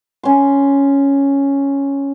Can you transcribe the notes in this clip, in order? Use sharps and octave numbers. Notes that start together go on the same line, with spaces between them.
C#4 C6